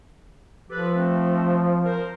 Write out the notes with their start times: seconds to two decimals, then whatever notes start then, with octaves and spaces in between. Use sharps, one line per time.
0.70 F3 G4 A4 B4
0.94 A3 C4
1.85 A#4 C5